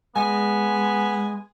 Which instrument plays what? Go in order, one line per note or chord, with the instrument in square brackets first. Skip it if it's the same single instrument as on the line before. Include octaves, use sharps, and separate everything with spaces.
[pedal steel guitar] G#3 [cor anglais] B3 [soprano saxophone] G#5